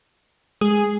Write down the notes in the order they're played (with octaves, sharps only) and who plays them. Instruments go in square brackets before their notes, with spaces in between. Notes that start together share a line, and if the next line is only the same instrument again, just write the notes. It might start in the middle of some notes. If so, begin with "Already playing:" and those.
[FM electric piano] G#3 [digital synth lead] G#4